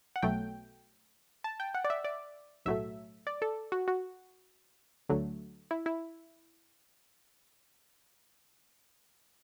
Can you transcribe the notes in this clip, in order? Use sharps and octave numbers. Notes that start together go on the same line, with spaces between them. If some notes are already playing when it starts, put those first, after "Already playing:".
F#5
B1 B2 F#3 A3 G5
A5
G5
F#5
D5
E5
D5
B1 A2 F#3 A3 E5
D5
A4
F#4
F#4
D2 D3 F#3 A3
E4
E4